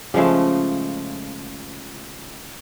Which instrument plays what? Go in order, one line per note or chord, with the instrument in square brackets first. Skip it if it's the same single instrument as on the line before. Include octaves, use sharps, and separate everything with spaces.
[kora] C#3 F3 G#3 A3